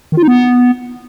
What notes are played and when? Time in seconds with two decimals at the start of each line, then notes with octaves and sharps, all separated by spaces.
0.12 D#3
0.17 F4
0.22 D#4
0.28 B3